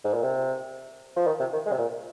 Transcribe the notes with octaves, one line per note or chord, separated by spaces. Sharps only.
G#2
A#2
C3
F3
D#3
C3
D#3
G#3
C3
A#2